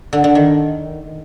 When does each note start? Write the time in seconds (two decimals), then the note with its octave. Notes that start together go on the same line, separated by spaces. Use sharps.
0.13 D3
0.24 D3
0.35 D#3